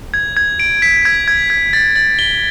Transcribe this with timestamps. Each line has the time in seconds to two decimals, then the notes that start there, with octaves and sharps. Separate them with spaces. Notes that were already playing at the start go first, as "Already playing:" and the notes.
0.14 G#6
0.37 G#6
0.60 D7
0.82 B6
1.05 G#6
1.28 G#6
1.50 G#6
1.73 A6
1.96 A6
2.19 G7